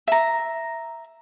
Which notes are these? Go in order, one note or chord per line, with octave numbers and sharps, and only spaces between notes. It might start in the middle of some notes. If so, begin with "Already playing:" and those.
E5 A#5